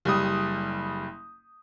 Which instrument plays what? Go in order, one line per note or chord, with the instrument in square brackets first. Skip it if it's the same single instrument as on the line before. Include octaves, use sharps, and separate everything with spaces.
[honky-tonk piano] F#1 G3 D#6